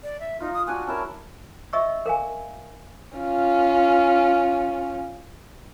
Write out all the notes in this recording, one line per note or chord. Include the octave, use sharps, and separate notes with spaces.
D5
E5
D#4 F4 F5
D#6
D4 F#4 F#5 G#5
C#4 E4 A#4 A5
D#5 E5 C#6 E6
A#4 F5 G#5
C#4 F4